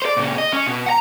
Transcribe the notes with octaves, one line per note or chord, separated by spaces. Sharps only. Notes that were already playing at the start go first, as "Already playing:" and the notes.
C5 D5
A#2 C#3
D#5
C#4
B2
F#5 A#5